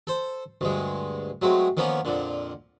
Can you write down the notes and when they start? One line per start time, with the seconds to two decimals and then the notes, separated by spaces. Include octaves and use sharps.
0.07 A4 C5
0.61 D2 G2 G#3
1.42 F#3 G#3 A3 C4
1.77 D#3 F3 A#3 B3 C#4
2.05 F2 A#2 D3